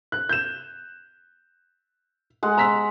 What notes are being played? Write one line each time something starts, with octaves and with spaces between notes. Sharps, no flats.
F#6
G6 E7
G#3 F#5
A#5 E6 B6